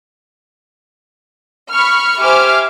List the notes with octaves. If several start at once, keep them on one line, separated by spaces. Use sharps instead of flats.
B5 C#6 F6
G4 C5 E5 G#5 D6 F6